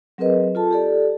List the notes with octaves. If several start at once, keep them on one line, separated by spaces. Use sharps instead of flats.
F#3 C4 G#4 A#4 B4 D#5
F4 A4 A5
G4 A4 D5